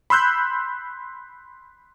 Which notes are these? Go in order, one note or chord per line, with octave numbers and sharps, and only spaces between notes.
B5 C6 E6 F#6 G6